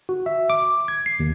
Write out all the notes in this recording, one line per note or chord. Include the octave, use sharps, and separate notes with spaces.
F#4
E5
D6
G#6
C7
D#2